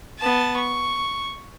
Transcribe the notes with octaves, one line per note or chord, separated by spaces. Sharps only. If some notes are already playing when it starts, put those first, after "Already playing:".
B3 A5
C#6